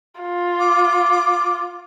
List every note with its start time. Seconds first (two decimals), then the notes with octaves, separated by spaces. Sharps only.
0.21 F4
0.60 D6